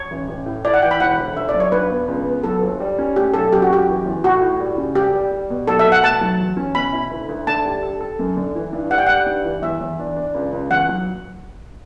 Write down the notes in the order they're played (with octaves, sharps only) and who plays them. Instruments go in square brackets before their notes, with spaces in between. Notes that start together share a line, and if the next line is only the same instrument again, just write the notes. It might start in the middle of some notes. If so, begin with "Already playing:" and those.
Already playing: [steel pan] C#5
[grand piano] A1
A1
A2
[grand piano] E4 [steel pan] D5
[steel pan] F#5
[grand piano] E3 [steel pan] G5
[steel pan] B5
[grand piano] E1 [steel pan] F#5
[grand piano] D2
[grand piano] G1 [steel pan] E5
[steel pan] D5
[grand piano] F#3
[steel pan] C#5
[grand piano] G2 [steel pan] B4
[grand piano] B3
C#2
B3
[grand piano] F#3 [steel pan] A4
[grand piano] G1
G3
C#4
[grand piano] A3 [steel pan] G4
[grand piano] B1 [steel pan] A4
[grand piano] F#2 [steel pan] G4
[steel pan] F#4
[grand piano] F#2 [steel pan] G4
[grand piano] E3
E2
[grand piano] A2 [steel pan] F#4
[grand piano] A2
G3
C#3
[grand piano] G3 [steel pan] G4
[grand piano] G3
G3
B2
[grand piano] F#3 [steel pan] A4
[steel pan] E5
[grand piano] B2
[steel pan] F#5
[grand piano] A3 [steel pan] A5
[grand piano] F#3
E2
C#4
[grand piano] B2 [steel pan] B5
[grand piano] E4
D2
D2
[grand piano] D3 [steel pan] A5
[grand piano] G3
A4
A4
F#2
D3
E3
G2
[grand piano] G3 [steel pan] F#5
[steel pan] G5
[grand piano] G3 [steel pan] F#5
[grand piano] G2
E3
[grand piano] E2 [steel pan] E5
[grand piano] E2
D4
D4
C#2
C#2
[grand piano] E2 [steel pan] F#5
[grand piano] F#3